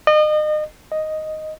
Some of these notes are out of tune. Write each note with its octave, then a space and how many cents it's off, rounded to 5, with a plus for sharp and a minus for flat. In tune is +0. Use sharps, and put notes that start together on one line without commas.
D#5 -35
D#5 +0